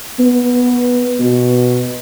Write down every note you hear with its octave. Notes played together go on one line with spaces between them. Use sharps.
B3
B2